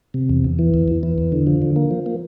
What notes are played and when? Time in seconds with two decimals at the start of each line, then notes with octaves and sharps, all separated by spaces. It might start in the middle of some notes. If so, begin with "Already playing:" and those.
0.14 C3
0.29 E2
0.44 E2
0.59 E3
0.74 E2
0.88 E2
1.03 E3
1.18 E2
1.32 D3
1.47 F3
1.62 D3
1.76 A#3
1.91 F3
2.06 A#3